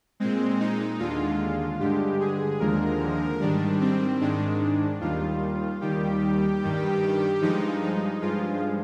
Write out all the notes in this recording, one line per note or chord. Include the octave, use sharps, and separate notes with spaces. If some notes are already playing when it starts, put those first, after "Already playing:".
A#2 G#3 C4
D#4
D#2 D3 G#3 F4
G2 D3 G#3 G4
G#4
D#2 D3 F3 G#3 A#4
G#2 D#3 G3 D4
C4
G#2 D#3 G#3 D4
D#2 D#3 G3 F4
D#2 D#3 G3 G4
G2 D#3 G3
G2 F3 G#3 D#4
D#4
G2 F3 G#3 F4